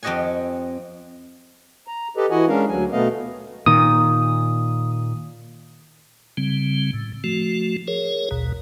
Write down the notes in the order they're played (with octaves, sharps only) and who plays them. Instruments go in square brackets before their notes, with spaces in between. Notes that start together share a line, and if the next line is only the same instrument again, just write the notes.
[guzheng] F2 C4 G4 D#5 F#5 G#5
[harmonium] A#5
G4 A4 B4 D#5
E3 E4 F#4 D#5 F#5 G#5
G#3 C#4 D4 A#4 F5
D2 F#3 G#5
B2 A3 B3 D#5 F5
[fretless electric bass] A#2 D#3 [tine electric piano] D#6
[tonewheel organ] C#3 G3 C4
A2
F3 A3 F#4
G#4 A#4 C#5
A#1 D#2 B2